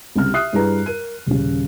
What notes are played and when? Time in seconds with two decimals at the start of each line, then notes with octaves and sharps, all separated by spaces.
0.15 C2 C#3 F6
0.34 E5 D#6 F#6 C7
0.53 G2 G3 E4 G#4 B4 A#5
0.86 A#4 D#7
1.26 D#1 C#3